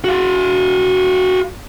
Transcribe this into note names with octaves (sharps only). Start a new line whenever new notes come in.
F#4 F5